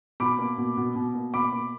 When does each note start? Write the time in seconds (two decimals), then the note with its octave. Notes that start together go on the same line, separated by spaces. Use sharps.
0.20 B2 B5 D6
0.39 A#3
0.58 B2
0.77 B2
0.96 B2
1.15 A#3
1.34 B2 B5 D6
1.52 A#3